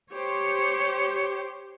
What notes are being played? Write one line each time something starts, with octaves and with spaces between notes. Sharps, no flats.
G4 C5 C#5